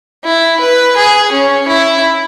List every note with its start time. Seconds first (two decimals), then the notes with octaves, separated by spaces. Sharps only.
0.24 E4
0.60 B4
0.96 G#4
1.32 C#4
1.68 E4